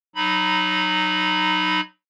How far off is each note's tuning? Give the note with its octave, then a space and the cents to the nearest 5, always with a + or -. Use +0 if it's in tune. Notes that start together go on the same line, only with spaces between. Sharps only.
F#3 +5 D#4 -15 B5 +0